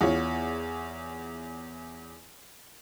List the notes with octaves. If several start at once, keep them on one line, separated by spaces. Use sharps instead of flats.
E2 F4 C#5